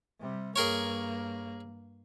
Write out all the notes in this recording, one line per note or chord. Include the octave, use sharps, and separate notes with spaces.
C3 G3
G2 A#3 G#4 A#4 C#5